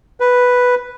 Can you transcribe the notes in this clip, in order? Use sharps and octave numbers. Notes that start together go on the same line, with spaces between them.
B4